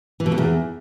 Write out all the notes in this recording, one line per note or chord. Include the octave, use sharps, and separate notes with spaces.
E3
B2
F2
E2